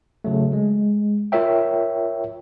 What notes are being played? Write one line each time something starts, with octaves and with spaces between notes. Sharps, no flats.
C#3 F#3 A3
G#3
F4 A#4 C#5 E5 G5